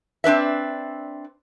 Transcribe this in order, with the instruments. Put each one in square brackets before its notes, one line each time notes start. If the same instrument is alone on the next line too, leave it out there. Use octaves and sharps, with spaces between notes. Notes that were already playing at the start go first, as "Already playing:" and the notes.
[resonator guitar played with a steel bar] C4 D4 B4 E5